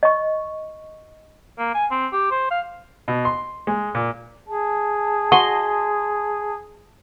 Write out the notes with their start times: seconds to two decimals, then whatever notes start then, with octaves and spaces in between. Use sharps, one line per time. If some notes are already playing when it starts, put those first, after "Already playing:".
0.03 D#5 C#6
1.58 A#3
1.74 G#5
1.91 C4
2.13 G4
2.31 C5
2.51 F5
3.08 B2
3.25 C6
3.67 G#3
3.95 A#2
4.48 G#4 A5
5.32 F#4 D#5 C6